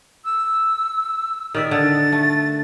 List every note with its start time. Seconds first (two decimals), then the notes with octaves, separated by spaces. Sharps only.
0.25 E6
1.55 D#3 D5 E5 D#6
1.71 D3 A6
2.12 A3